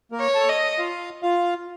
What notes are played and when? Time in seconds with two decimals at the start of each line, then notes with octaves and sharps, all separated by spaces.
0.12 A#3 A#4
0.20 C#5
0.35 A4 A5
0.49 D#5
0.79 F4 F5
1.23 F4 F5